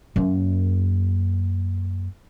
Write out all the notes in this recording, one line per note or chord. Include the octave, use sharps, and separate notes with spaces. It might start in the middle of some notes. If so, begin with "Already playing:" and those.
F#2 A#3